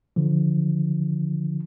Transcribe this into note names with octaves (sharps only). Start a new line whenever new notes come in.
D3 F3